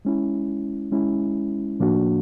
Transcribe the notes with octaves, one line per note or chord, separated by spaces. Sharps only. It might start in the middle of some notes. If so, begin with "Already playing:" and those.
G#3 C#4 E4
G#3 C#4 E4
A2 F3 A#3 D4 F#4